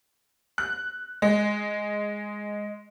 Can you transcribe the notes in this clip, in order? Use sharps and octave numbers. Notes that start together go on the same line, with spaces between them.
F#6
G#3